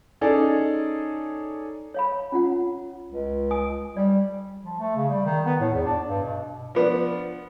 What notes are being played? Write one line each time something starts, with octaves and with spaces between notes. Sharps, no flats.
C#4 D#4 G#4 A4 D5
C#5 F5 B5
C#4 F4 F#5
C#2
G#5 D#6
G3 D5
F3
A3
C#3
G3
D#3
B3
A2
E2
D4
G2
B2
F3 B3 D4